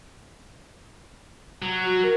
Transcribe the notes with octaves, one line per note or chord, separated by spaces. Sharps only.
F#3
F#4
A#4